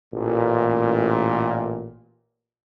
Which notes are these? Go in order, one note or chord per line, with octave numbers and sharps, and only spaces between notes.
A1 A#2